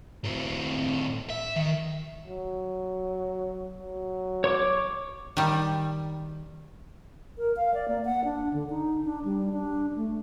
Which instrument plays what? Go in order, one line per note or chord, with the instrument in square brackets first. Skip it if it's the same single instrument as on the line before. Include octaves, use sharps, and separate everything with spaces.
[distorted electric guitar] A2 C4
E5
D#3
[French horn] F#3
F#3
[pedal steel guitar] C#5 C#6 D6
[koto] D#3 G3
[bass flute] A#4
F5
D5
A#3
F#5
D4
D3
D#4
D4
G3
D4
A3